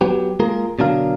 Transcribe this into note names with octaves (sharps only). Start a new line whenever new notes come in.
F#3 B3 G4
G#3 A#3 F4 G#4 A#4
B2 D3 F#3 D4 A#4 F5